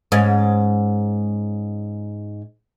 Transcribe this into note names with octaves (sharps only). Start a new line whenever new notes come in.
G#2 C#4